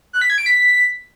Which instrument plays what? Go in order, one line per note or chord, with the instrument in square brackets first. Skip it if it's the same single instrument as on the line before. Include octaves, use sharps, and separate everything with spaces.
[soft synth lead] F#6
B6
G#6
D7
B6